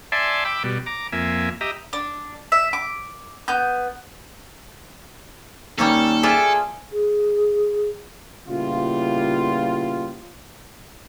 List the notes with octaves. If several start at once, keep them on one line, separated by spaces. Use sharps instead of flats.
D5 E5 G#5 A5 C6
G5 B5 D6 E6
B2 G3
A#5 D6
F2 A#3 E5 G#5
G4 D#5 E5 A#5
D4
E5
D6
B3 G6
D#2 G3 A#3 C#4 A4
F4 G#4 D5 E5
G#4
A#2 C#3 G3 B3 E4 F4